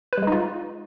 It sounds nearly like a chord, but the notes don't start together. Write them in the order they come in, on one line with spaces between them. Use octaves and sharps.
B4 G3 G#3 D#4 F4